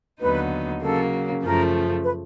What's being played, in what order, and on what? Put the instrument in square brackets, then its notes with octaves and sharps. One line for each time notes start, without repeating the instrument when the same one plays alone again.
[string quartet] D#2 D3 F#3 B3 D#4 [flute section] B4
[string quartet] C#3 F#3 A#3 [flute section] A4
[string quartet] F#2 C#3 F3 A3 [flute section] A#4
[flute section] B4